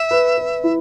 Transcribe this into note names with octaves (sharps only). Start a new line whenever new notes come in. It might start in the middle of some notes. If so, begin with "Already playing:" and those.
Already playing: E5
B4
B4
E4